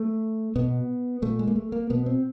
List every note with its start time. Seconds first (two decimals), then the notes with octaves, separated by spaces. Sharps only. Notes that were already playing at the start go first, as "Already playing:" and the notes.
Already playing: A3
0.56 B2 B3
1.22 A#2 A3
1.39 G#3
1.48 A#3
1.56 A3
1.72 A#3
1.90 B2 B3
2.06 C4